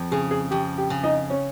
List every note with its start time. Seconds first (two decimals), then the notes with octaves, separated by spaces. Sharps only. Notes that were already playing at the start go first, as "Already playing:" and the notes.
Already playing: F2
0.12 C#3 G#4
0.31 G#4
0.51 F2 G4
0.78 G4
0.90 C#3
1.03 D#4 D#5
1.30 C#4 C#5